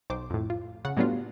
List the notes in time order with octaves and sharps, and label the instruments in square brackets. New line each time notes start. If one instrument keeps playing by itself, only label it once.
[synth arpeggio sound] B1 C5 D6
F2 A2
F4
C#3 F#5
A2 F#3 G3 B3 D4 F4